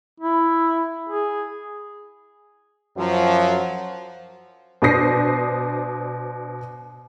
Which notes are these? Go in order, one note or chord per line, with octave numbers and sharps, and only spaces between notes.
E4
G#4
F#2 F3 F#3
B2 D4 C5 D#6 A#6 C7